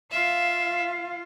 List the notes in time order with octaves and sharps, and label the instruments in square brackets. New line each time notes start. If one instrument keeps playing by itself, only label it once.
[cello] F4 F5 [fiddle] E5